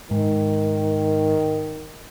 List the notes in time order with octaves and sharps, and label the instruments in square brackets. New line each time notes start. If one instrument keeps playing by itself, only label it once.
[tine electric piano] G#2 [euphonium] D#3